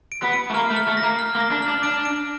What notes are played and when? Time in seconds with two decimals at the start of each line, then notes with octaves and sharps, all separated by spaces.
0.12 D7
0.23 B3
0.33 D7
0.50 A3
0.54 A#3 F6
0.70 A3
0.76 F6
0.87 A3
0.97 A#6
1.02 A#3
1.19 F6
1.35 A#3
1.40 A#6
1.51 D4
1.62 F6
1.68 D4
1.83 D4 D7
2.05 D7